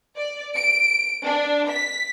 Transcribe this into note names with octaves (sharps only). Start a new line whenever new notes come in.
D5
D7
D4
B6